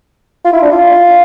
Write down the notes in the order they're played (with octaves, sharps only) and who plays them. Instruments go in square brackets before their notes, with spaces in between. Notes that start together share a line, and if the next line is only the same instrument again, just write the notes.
[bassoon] F4
E4
D4
F4